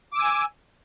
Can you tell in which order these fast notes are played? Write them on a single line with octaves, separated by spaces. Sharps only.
D6 E6 G#5